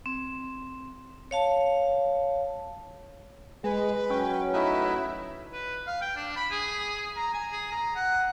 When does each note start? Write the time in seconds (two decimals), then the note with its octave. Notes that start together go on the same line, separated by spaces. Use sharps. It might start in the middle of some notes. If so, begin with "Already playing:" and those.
0.06 C4
1.31 C#5 F5 A5
3.64 G#3 G#4 B4
4.10 F#3 C#4 G5
4.53 A3 D#4 E4 B4
5.53 B4
5.87 F5
6.02 G5
6.16 D4
6.36 B5
6.51 G#4
7.16 A#5
7.33 G#5
7.52 G#4
7.72 A#5
7.95 F#5